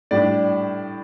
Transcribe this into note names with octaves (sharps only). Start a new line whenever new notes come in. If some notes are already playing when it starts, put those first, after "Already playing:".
A2 G3 D4 D5